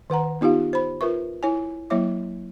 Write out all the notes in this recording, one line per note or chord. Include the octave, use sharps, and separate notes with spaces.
D#3 B4 F#5 A#5
B3 D#4 F4 G4 F5
C5 B5
F4 A#4 B4 E5 C#6
E4 C#5 G#5
F#3 A#3 E4 C#5 E5 D6